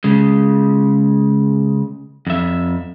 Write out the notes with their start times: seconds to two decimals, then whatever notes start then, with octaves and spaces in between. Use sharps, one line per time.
0.04 C#3 G#3
2.27 F2 E5